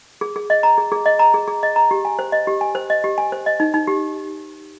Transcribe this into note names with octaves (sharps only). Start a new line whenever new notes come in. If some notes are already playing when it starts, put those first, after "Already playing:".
G#4
G#4
D#5
A#5
G#4
G#4
D#5
A#5
G#4
G#4
D#5
A#5
G4
G#5
C5
D#5
G4
G#5
C5
D#5
G4
G#5
C5
D#5
D#4
D#4
G4